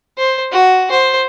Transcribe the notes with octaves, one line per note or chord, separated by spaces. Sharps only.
C5
F#4
C5